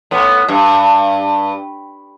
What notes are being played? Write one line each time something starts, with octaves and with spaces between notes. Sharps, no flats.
A2 B3
G2